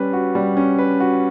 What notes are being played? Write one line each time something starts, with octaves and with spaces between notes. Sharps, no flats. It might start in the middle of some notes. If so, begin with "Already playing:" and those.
Already playing: G3 C#4 B4
F#4
G3
C#4
B4
F#4